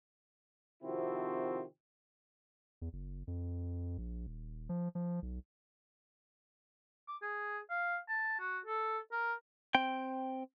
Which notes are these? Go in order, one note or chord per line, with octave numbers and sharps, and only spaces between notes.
C3 D#3 F3 C4 E4 F#4
E2
F#1
F2
A#1
D#1
F3
F3
B1
D6
G#4
F5
A5
F#4
A4
A#4
C4 G5